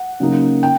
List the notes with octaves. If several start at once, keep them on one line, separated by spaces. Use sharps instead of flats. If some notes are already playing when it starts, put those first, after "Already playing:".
Already playing: F#5
C#3 F#3 A#3 D#4
G5